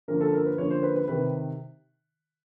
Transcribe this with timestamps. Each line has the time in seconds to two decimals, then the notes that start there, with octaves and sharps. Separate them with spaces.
0.08 D3 F3 A#3 C#4 F4 A#4
0.21 A4
0.33 A#4
0.46 B4
0.58 D3 F3 A#3 C#4 F4 C#5
0.70 C5
0.83 B4
0.96 B4
1.08 C3 D#3 B4